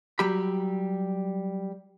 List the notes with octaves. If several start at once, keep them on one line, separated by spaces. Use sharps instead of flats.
F#3 G3 G4 B5